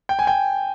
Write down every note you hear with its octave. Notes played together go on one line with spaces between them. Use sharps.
G5
G#5
G5